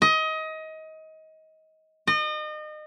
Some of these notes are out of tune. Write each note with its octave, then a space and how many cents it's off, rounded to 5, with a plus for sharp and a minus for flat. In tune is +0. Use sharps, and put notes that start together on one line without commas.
D#5 +25
D#5 -35